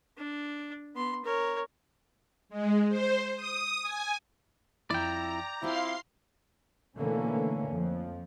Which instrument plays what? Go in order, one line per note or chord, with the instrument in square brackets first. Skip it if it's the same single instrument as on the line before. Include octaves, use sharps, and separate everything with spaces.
[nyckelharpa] D4
B3 C6
A#4 C#5
[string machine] G#3
C5
D#6
G#5
[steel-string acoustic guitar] F2 E4 [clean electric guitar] D5 G5 [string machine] A#5
[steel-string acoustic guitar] C4 F4 G4 [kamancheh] E4 [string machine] F5 C6 C7
[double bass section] B2 D3 E3 A3 A#3 C#4
F2 F3